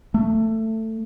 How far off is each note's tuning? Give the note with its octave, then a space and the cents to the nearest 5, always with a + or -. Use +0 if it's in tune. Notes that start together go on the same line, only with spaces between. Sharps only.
A3 +15